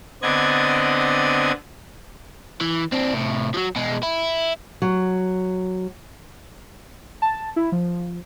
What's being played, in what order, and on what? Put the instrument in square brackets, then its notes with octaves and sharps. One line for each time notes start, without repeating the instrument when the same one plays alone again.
[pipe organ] D3 B3 C4 D5 D#5 G#6
[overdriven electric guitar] E3
C4 D4
C2 A2
F3 F#3
B2 G#3
E4
[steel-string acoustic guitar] F#3
[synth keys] A5
E4
F3